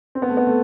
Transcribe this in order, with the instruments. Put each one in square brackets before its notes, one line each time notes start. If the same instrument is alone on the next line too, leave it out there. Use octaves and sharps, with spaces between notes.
[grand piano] C4
B3
A3
B3
A3